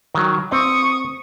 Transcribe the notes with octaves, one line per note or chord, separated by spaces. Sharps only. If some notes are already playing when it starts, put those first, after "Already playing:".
D#3 F#3
C4 C#6 D#6